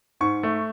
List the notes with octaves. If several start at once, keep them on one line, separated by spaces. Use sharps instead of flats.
G#2 C#6
A3